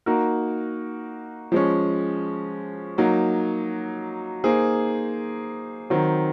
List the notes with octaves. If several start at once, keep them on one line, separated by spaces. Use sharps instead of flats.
A#3 D#4 F#4 A#4
F3 G#3 C#4
F#3 A#3 D#4
A#3 D#4 G#4 C5
D#3 F#3 C4